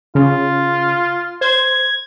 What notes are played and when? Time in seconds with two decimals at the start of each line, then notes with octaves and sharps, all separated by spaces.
0.15 C#3 F4
1.41 C5 G#6